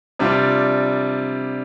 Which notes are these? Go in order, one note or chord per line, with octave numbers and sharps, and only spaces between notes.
C3 G3 D4 F4